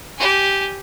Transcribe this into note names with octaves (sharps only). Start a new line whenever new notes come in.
G4 G#5